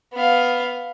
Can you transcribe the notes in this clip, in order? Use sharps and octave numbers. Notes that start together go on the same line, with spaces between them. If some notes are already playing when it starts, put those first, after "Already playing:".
B3 F5